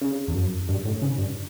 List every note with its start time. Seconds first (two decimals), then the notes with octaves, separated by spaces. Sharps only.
0.01 C#3
0.28 E2
0.35 F#2
0.69 G2
0.85 A2
1.02 C#3
1.18 G2